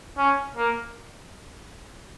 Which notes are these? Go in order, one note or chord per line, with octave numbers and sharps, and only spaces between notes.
C#4
A#3